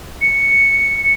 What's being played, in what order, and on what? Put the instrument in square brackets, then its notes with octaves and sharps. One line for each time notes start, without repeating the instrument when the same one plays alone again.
[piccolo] C#7